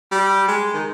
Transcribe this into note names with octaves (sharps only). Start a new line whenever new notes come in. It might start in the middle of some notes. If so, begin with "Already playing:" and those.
G3
G#3
D#3